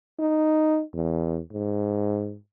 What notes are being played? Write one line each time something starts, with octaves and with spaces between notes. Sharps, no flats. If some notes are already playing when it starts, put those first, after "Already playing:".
D#4
E2
G#2